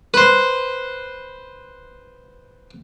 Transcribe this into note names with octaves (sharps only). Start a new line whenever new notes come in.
B4 C5